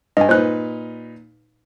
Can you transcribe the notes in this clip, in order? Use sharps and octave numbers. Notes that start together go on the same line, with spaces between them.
G2 D#5 G#5
A#2 D#4 B4 C5 F#6